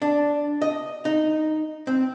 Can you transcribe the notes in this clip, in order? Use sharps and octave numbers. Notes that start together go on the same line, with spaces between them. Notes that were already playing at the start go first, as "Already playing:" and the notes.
D4
D#5
D#4
C4